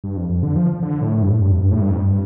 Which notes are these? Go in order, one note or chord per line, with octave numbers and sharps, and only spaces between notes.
G2
F2
F2
D3
F3
D3
A2
G2
A2
G2
F2
G2
A2
G2
F2
G2